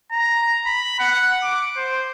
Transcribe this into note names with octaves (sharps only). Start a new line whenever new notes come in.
A#5
B5
F#5
D6
C5